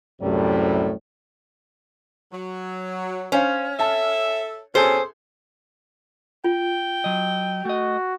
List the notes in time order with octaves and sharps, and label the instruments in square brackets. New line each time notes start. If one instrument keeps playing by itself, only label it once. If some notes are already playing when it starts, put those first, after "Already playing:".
[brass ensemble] C2 F#2 A2 C3 G3 A3
[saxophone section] F#3
[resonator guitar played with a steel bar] C#4 [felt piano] C5 C#5 F5
[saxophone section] A4 E5 [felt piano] A5
[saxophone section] B2 C4 C#4 [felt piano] G#4 A4 G#5 [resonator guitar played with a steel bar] C5
[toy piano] F4 [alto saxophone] G5
[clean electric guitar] F#3 D#5
[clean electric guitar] A3 D#5 [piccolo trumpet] F#4